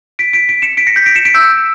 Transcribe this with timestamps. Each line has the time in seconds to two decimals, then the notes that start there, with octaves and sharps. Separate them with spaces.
0.19 B6 D7
0.33 B6 D7
0.49 B6 D7
0.62 C#7 E7
0.77 B6 D7
0.87 A#6 C#7
0.96 G6 B6
1.06 B6 D7
1.15 C#7 E7
1.25 B6 D7
1.35 E6 G6